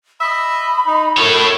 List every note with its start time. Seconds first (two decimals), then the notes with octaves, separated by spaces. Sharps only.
0.20 D#5 E5 B5
0.86 D#4
1.17 F#2 A2 A4 C#5 B5